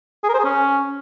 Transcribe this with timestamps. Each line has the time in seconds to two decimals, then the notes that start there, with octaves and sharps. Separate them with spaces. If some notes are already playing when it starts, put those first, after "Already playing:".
0.24 G#4
0.29 A#4
0.34 C5
0.39 G#4
0.44 C#4